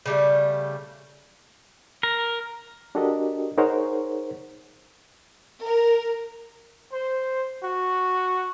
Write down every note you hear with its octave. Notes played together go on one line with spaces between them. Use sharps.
C#3 G3 A3
A#4
D4 F#4 G4 A4 A#4 D#5
D#4 G#4 A#4 C5 C#5 F#5
A#4
C5
F#4